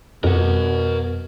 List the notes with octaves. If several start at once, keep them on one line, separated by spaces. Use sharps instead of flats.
F2 B2 A#4 F#5